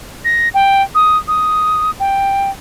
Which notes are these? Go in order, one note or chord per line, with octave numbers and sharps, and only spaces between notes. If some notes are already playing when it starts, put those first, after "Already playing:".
A#6
G5
D#6
D#6
G5